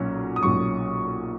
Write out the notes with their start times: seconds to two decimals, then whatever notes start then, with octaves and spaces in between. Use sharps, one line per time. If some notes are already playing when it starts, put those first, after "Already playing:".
Already playing: B1 A#2 F#3 C#4
0.36 D#6
0.43 B1 A#2 F#3 C#4 C#6